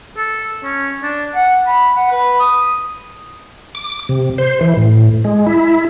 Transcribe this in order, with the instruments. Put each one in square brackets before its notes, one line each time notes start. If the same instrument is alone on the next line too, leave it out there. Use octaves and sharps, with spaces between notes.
[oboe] A4
C#4
D4
F#5
B5
F#5
B4
D#6
[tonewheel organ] D6
C3
C5
E3
A2
G#3
E4